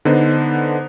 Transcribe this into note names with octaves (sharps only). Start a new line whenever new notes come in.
D3 B3 D4 D#4 C5